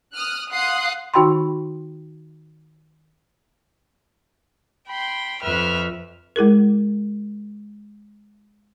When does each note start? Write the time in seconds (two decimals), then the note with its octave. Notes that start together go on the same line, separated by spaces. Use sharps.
0.13 D#6 F6 F#6
0.51 F5 F#5 C6 D#6 F#6 C7
1.14 D#3 D#4 F#4 G5 B5 C6
4.87 G5 B5 C6
5.43 F2 B4 E5 F6
6.36 G#3 E4 G#4 A#4